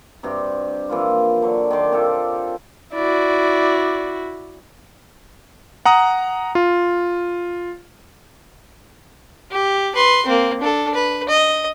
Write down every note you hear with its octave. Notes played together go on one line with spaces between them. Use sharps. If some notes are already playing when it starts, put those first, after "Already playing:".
G2 C3 F#4 G4
E3 F3 A#3 F4
D3 F#3
D#3 D5 C6 D6
C3 F4 G4 A4
E4 F#4 D5
F#5 A#5 D#6
F4
G4
B4 C6
A#3 C4
D4 A4
B4
D#5